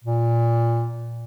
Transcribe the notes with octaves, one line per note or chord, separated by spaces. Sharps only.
A#2